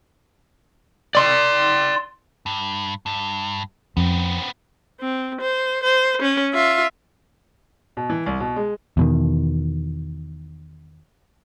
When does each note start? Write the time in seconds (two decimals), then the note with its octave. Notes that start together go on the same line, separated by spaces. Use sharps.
1.15 D5 C6
2.46 G2
3.06 G2
3.97 F2 B3 C4
5.00 C4
5.41 C5
5.84 C5
6.22 C#4
6.53 F4 E5
7.97 B2
8.10 E3
8.26 C2
8.40 B2
8.56 G#3
8.97 E2 B2 D#3